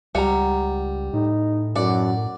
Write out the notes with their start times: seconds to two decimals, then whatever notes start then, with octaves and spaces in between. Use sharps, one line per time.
0.15 C#2 G3 F#5 A#5
1.14 A2 D#4
1.76 F#2 A2 D5 F#5